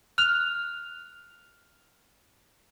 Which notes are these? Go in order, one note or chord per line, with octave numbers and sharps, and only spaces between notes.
F6 F#6 F7